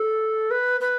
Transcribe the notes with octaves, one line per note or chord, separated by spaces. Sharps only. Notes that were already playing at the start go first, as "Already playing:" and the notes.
Already playing: A4
B4
B4